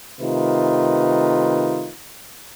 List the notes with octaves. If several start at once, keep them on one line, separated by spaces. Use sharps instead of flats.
C3 D#3 A3 D#4 F4 B4